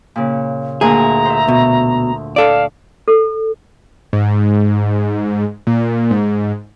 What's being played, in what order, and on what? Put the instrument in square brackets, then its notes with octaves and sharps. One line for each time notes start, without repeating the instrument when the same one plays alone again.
[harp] A#2 C#3
[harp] D2 A#2 F#6 [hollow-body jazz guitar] G#4 [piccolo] A#5
[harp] C5 E5
[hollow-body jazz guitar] B2
[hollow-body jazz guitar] A4 D5 [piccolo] F5
[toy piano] A4
[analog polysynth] G#2
A#2
G#2